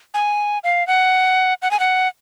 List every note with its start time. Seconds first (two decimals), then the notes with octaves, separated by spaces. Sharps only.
0.14 G#5
0.64 F5
0.87 F#5
1.62 F#5
1.71 G#5
1.80 F#5